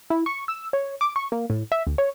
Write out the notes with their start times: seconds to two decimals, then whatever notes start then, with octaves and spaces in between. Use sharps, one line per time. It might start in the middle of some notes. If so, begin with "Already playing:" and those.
0.10 E4
0.26 C#6
0.48 E6
0.73 C#5
1.01 D6
1.16 C#6
1.32 A#3
1.50 A2
1.72 E5
1.87 D2
1.98 C#5